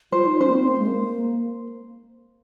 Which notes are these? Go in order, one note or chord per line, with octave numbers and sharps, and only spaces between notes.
F4 C5
D#4
C#4 C5
A#3
C4
A#3
G#3
A#3